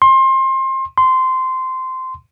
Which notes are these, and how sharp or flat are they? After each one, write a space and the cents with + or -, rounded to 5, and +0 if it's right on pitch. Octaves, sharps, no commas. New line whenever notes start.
C6 +25
C6 -15